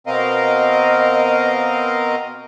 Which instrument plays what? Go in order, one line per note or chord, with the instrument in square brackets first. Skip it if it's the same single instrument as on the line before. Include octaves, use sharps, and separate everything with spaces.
[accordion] B2 C4 A#4 D#5 F5